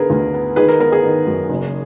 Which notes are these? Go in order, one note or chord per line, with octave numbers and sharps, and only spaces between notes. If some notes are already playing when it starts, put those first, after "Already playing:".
Already playing: D3 B3 G#4 A#4 B4
D2
B3
D#3 G#4 B4
A#4
B3 A#4
G#4
D#3
F#2
F#1